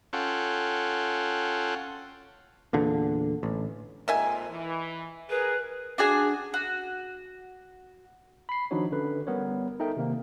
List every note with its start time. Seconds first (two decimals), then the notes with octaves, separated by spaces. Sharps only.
0.13 C#4 F4 A4 F#5 G5
2.73 E2 A#2 D3
3.43 A1
4.08 F2 A#2 D#3 G#3 E5 G#5
4.49 E3
5.30 G#4 A#4 B4
5.98 D4 F#4 G#4 G#5
6.54 F#4
8.49 B5 C7
8.71 D#3 F3 D4 D#4 F#4 C#5
8.92 D3 C#4 B4
9.27 G3 B3 A#4 C#5
9.80 D#4 A4 A#4 E5 G5
9.96 C3 D#3 A#3